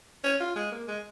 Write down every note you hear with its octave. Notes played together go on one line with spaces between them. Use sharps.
C#4
F4
G#3
A#3
G#3